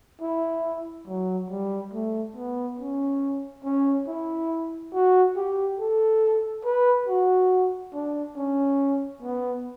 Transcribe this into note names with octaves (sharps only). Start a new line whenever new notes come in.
E4
F#3
G3
A3
B3
C#4
C#4
E4
F#4
G4
A4
B4
F#4
D4
C#4
B3